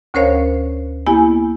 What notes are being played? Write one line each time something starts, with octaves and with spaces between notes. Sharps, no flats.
D2 C#4 A#4 C5 C#5 F5
A#3 B3 E4 G4 G#5